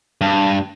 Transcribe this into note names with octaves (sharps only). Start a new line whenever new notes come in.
G2